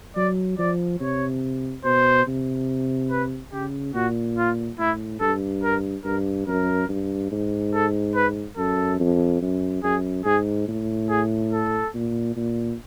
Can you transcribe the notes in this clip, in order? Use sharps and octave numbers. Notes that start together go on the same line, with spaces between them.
F#3 D5
F3 D5
C3 C#5
B2 C5
C3
B4
C#3 G4
A#2 F#4
F4
A2 E4
G2 A4
A#4
G2 A#4
F#2 A#4
G2
G#2
A4
B4
F#2 A4
F2
F#2
F#2 G#4
G#2 G#4
A2
G#4
A4
A#2
A#2